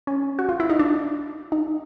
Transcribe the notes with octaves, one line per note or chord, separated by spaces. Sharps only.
C#4
F#4
F4
E4
D#4
D4
D#4